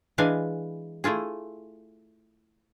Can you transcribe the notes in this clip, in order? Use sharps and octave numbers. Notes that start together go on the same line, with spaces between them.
E3 G#3 D4 B4 F5 G#5
A3 E4 F4 G#4